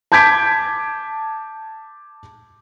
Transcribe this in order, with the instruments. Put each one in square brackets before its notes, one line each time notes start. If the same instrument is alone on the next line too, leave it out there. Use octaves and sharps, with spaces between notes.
[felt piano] A5 D6 G6 G#6 B6 D7